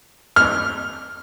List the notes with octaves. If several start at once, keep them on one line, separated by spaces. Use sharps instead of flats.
F6